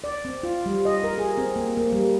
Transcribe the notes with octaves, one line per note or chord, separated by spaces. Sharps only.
D5
C4
F4
G3
D#5
A#4
G#4
C4
A#3
A#3
G3